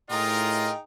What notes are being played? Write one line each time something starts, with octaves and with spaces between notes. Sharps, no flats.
A2 D#4 F4 G#4 A#4 D#5 G5